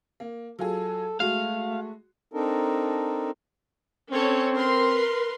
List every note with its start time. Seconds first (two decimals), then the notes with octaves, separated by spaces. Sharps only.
0.20 A#3
0.59 F#3 F4 G#4 A4
1.20 G#3 A3 F#4 F5
2.34 C4 D4 D#4 A4 A#4
4.12 C4 C#4 A4 C#5
4.54 A#4 B4 C6